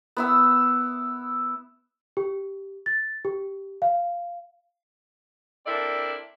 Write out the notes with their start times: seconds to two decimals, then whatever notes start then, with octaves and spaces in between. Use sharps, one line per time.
0.17 B3 E4 E6
2.17 G4
2.86 A6
3.25 G4
3.82 F5
5.67 C4 D4 E4 A4 A#4 D5